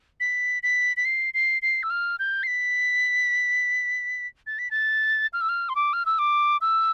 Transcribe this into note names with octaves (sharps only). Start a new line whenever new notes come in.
B6
B6
B6
C7
C7
C7
E6
F6
G6
C7
B6
A6
B6
A6
F6
E6
F6
C6
D6
F6
E6
D6
E6